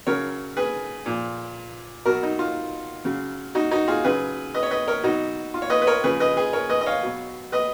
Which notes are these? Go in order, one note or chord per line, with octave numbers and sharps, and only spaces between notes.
C#3 F#3 A#4 C#5
G#4 B4
A#2 F3
B2 F#3 F#4 A#4
D#4
F4
C#3 F#3
D#4 F#4
D#4 F#4
F4 G#4
C#3 F#3 G#4 B4
B4 D#5
C#5
B4 D#5
A#4 C#5
B2 F#3 D#4 F#4
F4
C#5
B4 D#5
B4
A#4 C#5
C#3 F3 G#4 B4
B4 D#5
G#4 B4
A#4 C#5
B4 D#5
D#5
C#5 F5
B2 F#3
B4 D#5